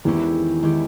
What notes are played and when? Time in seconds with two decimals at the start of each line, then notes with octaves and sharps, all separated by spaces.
0.04 E2 D#3 E3 G#3 C#4 E4 G4
0.62 D#3 G#3 C#4 E4 G4